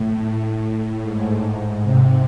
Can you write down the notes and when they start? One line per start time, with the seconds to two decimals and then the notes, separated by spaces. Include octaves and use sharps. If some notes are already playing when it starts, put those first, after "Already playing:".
Already playing: A2
0.60 A2
1.02 G#2
1.83 C3